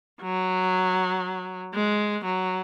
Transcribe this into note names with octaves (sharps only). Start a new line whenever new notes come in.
F#3
G#3
F#3